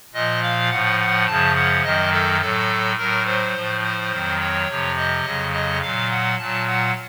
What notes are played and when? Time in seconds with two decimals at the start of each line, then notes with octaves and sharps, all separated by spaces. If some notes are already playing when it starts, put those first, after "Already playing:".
0.13 A#2 F3 D#5
0.43 F5
0.70 A2 F3 F#5
1.00 F#5
1.27 F#2 C#3 F3 A5
1.56 F#5
1.84 F#2 D#3 F#3 D#5
2.13 A4
2.41 A2 F#3 A4
2.97 A2 F#3 A#4
3.26 C5
3.55 A2 F3
3.83 C5
4.11 F2 D#3 F#3
4.40 C#5
4.68 F2 C3 F3
4.96 D#5
5.24 F2 C#3 F#3
5.53 D#5
5.81 A#2 F#3 F5
6.10 F#5
6.39 A#2 F#3 A5
6.67 F#5